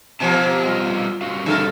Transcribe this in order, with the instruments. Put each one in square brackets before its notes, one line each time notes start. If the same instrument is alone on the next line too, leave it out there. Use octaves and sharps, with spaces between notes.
[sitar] B2 F3 A#3 [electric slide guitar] G4 G#5 A5
[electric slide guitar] G3 F4 D#5
G2 F#4 F5
[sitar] D3 A4 A#4